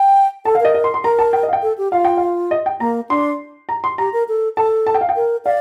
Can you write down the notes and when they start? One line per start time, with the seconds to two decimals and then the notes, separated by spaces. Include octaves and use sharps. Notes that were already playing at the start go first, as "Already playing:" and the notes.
Already playing: G5
0.45 A4 A5
0.55 F5
0.60 A#4 D#5
0.74 D#5
0.84 C6
0.94 C6
1.04 A#4 A#5
1.19 A5
1.33 G5
1.43 D#5
1.48 F5
1.53 G5
1.62 A4
1.78 G4
1.92 F4 F5
2.05 G5
2.17 F5
2.51 D#5
2.66 G5
2.80 A#3 A#5
3.09 D4 C6
3.69 A#5
3.84 C6
3.98 G4 A#5
4.13 A#4
4.28 A4
4.57 A4 A5
4.87 A5
4.94 G5
5.01 F5
5.09 G5
5.16 A#4
5.45 D5 F5